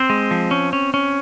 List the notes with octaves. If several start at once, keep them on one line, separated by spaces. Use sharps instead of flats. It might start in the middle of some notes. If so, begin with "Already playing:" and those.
Already playing: C4 C5
G#3
F3
C#4
C#4
C#4